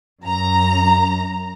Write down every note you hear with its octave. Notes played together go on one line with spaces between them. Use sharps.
F#2 A#5